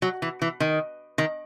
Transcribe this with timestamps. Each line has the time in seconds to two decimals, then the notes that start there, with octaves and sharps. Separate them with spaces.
0.02 F#3
0.22 E3
0.42 E3
0.60 D#3
1.18 D#3